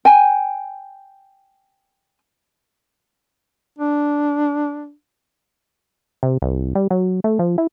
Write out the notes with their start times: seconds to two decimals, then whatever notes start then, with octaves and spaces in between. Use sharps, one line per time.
0.05 G5 G#5
3.79 D4
6.23 C3
6.42 C2
6.75 G3
6.91 F#3
7.24 A3
7.39 F3
7.58 E4